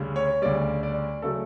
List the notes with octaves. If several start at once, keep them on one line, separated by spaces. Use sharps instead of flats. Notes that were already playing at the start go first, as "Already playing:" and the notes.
Already playing: D2 C#3 G3
C#5
D2 C#3 G3 D5
D5
C#3 F#3 A3 A4